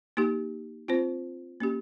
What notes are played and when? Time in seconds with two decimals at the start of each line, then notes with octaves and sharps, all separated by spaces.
0.17 A#3 D#4 G4
0.88 C4 F4 C5
1.60 A#3 C#4 G4